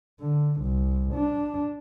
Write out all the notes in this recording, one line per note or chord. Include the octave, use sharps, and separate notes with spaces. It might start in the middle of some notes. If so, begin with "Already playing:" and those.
D3
C2
D4